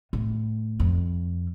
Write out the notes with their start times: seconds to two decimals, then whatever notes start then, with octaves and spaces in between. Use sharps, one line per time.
0.13 A2
0.80 F2